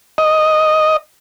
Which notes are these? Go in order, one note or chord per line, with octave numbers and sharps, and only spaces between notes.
D#5